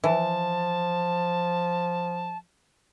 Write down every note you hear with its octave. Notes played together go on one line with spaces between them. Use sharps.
E3 F3 A5